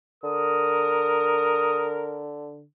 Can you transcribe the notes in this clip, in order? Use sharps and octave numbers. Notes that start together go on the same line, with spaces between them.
D3 A#4 D#6